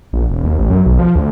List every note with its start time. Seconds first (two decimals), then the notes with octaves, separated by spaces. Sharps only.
0.13 A#1
0.30 E1
0.44 D#2
0.59 A1
0.70 F#2
0.86 B1
0.99 F3
1.15 D2